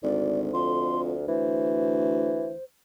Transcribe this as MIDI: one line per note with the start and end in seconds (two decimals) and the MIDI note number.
0.03 0.50 32
0.03 1.28 38
0.03 0.40 74
0.54 1.16 41
0.54 1.01 84
1.28 2.63 38
1.28 2.53 52
1.28 2.64 72